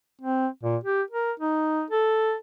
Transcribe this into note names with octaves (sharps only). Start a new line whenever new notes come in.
C4
A#2
G4
A#4
D#4
A4